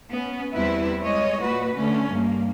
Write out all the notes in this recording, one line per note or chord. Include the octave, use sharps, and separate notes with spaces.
B3 C#4
E2 G3 C4 E4 B4
G#3 C#5 D#5
A#2 F#4 B4
D3 A3 C#4
G2 A#3